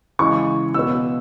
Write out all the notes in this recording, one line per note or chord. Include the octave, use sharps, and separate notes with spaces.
C#3 E3 G#3 C#6
B2 B3 E6